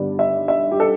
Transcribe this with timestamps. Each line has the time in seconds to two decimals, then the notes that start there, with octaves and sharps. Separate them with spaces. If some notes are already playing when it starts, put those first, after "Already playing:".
Already playing: G2 D3 G3 B3 D5
0.19 E5
0.48 E5
0.71 G4
0.80 A4